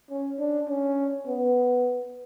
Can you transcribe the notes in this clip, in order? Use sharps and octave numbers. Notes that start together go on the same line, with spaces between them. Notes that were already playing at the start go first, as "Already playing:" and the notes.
C#4
D4
C#4
B3